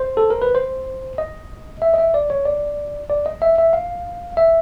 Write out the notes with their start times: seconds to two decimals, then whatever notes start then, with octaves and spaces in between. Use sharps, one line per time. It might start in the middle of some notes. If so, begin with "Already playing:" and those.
Already playing: C5
0.17 A4
0.30 A#4
0.42 B4
0.55 C5
1.18 D#5
1.82 E5
1.94 D#5
1.98 E5
2.14 D5
2.30 C#5
2.45 D5
3.10 D5
3.26 D#5
3.42 E5
3.58 E5
3.73 F5
4.37 E5